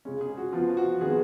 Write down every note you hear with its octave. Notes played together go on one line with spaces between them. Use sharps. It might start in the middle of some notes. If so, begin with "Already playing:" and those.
C#3 G#3 C#4
G#4
F#4
F3 B3 F4
F#4
D#3 G#3 B3 G#4